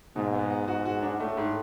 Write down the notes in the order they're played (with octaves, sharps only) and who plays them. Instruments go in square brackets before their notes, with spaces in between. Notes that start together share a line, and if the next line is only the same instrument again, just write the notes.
[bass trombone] G#2 [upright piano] B2
[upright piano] B3
B3
[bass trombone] G#2 [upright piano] F#4
[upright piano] F#4
D4
[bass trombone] A2 [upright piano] A3
[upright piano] G#2